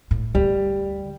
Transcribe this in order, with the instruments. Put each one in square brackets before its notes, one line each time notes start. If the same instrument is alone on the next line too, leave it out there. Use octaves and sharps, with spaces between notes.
[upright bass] A2
[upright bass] D2 [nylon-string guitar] G3